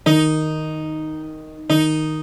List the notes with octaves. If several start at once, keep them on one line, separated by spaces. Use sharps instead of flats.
D#3 D#4
D#3 D#4